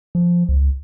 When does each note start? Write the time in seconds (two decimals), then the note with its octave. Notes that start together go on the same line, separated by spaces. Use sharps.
0.15 F3
0.49 C#2